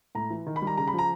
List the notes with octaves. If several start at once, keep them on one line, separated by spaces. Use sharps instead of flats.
A2 A#5
E3
D#3
B5
G3
A#5
C#3 A#5
B5
F3
A#5